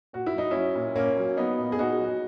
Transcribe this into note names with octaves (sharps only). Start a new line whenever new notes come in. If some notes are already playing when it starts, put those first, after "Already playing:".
A#2 F#4
E4
F#3 D#4
F#3 C#4 E4
A#2
A#2 A#3 C#4
F#3
F#3 B3 D#4
A#2
G#4
A#2 D#4 F#4
F#3